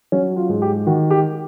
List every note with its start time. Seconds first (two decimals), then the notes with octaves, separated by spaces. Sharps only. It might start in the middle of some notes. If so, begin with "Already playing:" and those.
0.12 F#3 C#4
0.36 F4
0.49 G#2
0.62 G4
0.87 D#3 F#4
1.10 G4